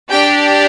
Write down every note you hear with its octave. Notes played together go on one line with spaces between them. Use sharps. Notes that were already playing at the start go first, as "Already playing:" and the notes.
D4 G4 G5